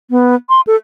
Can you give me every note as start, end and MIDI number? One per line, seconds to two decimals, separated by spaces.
0.10 0.35 59
0.49 0.61 84
0.67 0.76 69